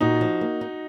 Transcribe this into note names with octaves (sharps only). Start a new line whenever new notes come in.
A#2 D#4 F#4
F3
A#3
D#4